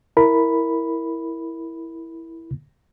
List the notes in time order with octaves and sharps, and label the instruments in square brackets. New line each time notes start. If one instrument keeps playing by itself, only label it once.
[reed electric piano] E4 A#4 B5